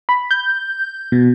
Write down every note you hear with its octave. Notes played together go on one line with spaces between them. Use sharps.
B5
G6
B2